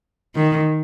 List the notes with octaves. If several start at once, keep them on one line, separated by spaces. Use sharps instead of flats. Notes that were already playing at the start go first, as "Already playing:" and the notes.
D#3